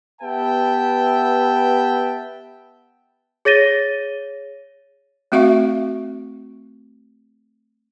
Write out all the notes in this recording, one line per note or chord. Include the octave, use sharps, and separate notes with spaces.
B3 G4 B4 E5 G5 A5
G#4 C#5 A6 A#6 D#7 G7
A3 C4 F#4 E5 F5 C#6